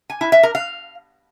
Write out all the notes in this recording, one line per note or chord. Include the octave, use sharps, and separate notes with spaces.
G#5
E4
E5
A#4
F5